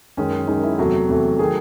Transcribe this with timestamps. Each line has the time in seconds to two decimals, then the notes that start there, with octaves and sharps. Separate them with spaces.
0.17 F#2 D#3 G#3 C#4
0.47 F#2 D#3 G#3 D#4
0.63 E4
0.78 E2 C3 F#3 A3 F#4
1.09 E2 C3 F#3 A3
1.39 D#3 F#3 A3 G#4